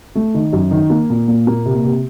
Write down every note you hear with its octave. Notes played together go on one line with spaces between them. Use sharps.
A3
D#3
F#2
D#3
A#3
A#2
A#2
A#3
C3
C3